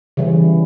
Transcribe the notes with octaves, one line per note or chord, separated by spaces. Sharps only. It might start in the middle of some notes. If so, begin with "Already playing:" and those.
C#3 E3 G3